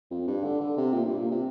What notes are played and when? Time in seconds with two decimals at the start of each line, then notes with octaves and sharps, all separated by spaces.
0.11 F2
0.27 G2
0.44 D3
0.60 D3
0.77 C3
0.93 A#2
1.06 G2
1.18 A#2
1.31 C3